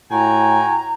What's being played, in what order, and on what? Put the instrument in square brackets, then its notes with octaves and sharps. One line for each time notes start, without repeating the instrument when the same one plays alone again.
[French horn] A2 [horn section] F#4 G5 G#5 [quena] A#5